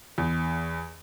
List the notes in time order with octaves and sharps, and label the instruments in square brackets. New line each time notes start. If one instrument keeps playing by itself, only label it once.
[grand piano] E2